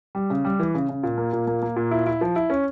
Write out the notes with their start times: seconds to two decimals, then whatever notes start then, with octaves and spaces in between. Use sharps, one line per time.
0.15 G3
0.30 C#3
0.45 G3
0.60 E3
0.75 C#3
0.89 C#3
1.03 A#2
1.17 A#3
1.33 A#2
1.47 A#3
1.62 A#3
1.76 A#2
1.91 E4
2.07 E4
2.21 F3
2.36 E4
2.50 C#4